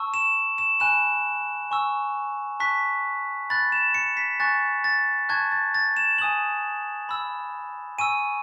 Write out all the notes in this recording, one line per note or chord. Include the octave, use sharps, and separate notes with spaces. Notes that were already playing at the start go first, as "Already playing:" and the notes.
Already playing: A5 C#6 E6
E7
E7
G#5 B5 F#6 E7
G#5 C#6 E6
A5 C#6 F#6 B6
B5 F#6 A6
E7
C#7
B6
G#5 C#6 F#6 A6
A6
A5 C#6 F#6 G#6
A6
A6
E7
G#5 D#6 F#6 F#7
B5 E6
G#5 C#6 E6 D#7